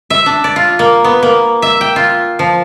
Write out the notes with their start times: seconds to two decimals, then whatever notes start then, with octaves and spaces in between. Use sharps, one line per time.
0.10 E5
0.26 D4
0.44 D5
0.56 F4
0.79 A#3
1.04 B3
1.23 A#3
1.62 E5
1.81 G5
1.96 F4
2.39 F3